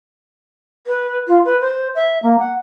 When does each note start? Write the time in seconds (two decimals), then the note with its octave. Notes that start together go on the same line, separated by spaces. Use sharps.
0.87 B4
1.27 F4
1.45 B4
1.60 C5
1.95 E5
2.23 A#3
2.39 F#5